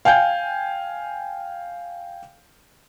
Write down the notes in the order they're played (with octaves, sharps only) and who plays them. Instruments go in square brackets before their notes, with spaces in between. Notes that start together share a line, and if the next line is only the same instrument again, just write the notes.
[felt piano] F5 G5 G#5 G6